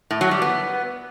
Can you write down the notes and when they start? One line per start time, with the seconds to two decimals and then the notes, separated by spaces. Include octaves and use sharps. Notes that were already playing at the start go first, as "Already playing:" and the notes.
0.11 A2
0.21 F#3
0.31 G3
0.42 B3